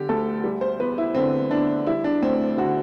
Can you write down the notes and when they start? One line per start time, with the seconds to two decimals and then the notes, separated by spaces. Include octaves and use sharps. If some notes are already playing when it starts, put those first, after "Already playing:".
Already playing: D3 G4
0.09 D2 A4
0.44 G3
0.61 C5
0.79 E2 B4
0.98 E4
1.15 D3 C4
1.50 E2 D4
1.87 G3 E4
2.04 D4
2.22 D2 C4
2.57 D3 F#4